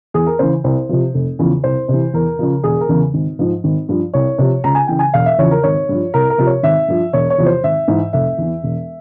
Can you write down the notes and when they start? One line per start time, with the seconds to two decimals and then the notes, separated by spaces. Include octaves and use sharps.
0.14 E2 G#4
0.27 A#4
0.39 C#3 E3 C5
0.64 C2 C5
0.89 C3 F3
1.14 F1
1.39 E2 C#3 F3
1.64 C2 C5
1.88 C3
1.94 E3
2.14 E2 A#4
2.39 C#3 F3
2.63 E1 G#4
2.81 A#4
2.89 E2 C#3 E3
3.14 G#1
3.39 G#2 F3
3.64 G#1
3.89 G2 F3
4.14 C2 C#5
4.38 C3 F3
4.64 C#2 A#5
4.75 G#5
4.87 C#3 E3 G5
4.99 G#5
5.14 E1 F5
5.26 E5
5.39 E2 C#3 F3 C#5
5.51 A#4
5.63 G#1 C#5
5.89 G2 F3
6.14 C2 A#4
6.30 A#4
6.38 C3 F3
6.47 C#5
6.63 G#1 E5
6.88 G2 F3
7.13 E1 C#5
7.30 C#5
7.38 E2 C3 F3
7.46 C5
7.63 G#1 E5
7.88 G#2 E3
8.13 F1 E5
8.38 E2 E3
8.63 E1